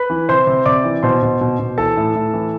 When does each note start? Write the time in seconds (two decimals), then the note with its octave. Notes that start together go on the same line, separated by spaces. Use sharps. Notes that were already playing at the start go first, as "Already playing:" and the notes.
Already playing: B4 B5
0.10 E3
0.29 C3 C5 C6
0.47 C3
0.65 C3 D5 D6
0.84 E3
1.03 B2 C5 C6
1.22 B2
1.41 B2
1.59 B2
1.78 E3 A4 A5
1.97 A2
2.15 A2
2.33 E3